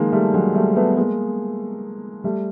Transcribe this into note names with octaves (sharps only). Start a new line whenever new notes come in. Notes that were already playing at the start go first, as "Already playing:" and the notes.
Already playing: D#3 F3 G#3 A#3
G3 A3
F#3 G#3
G3 A3
A3 B3
G#3 A#3
G3 A3